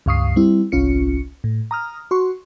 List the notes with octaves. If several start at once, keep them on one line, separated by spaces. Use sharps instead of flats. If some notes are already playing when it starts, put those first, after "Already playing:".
C#2 G2 F5 C#6 D#6 C7
G3 C4 E4
G1 C2 C#4 F4 C#7
A2
A#5 D#6 F6
F#4 C6 C#6